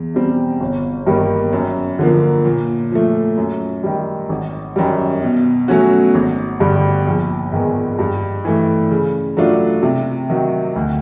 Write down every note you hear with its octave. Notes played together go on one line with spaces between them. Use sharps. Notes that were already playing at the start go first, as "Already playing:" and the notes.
Already playing: E2
B2 G3 C4
G1
G2 D#3 G3 A#3
F#2
D3 F3 A#3
A#2
F3 A3
F#2
D#3 G3
G#1
F#2 D#3 G3
B2
F#3 A3 C#4 F#4
G#1
G2 D3 G3
A#1
G#2 D#3 G#3 B3
G2
E3 A3
C#3
F#3 A3 D4 F4
C3
D#3 F#3
D2